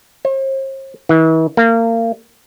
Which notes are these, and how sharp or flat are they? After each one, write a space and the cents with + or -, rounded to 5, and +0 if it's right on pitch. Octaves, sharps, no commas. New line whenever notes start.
C5 +45
E3 -40
A#3 -30